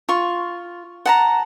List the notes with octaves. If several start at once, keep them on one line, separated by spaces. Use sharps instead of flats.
F4 C#6
F#5 A5 A#5